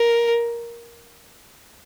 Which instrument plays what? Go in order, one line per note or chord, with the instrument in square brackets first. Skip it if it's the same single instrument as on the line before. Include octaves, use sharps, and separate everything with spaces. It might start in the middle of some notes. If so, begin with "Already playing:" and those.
Already playing: [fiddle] A#4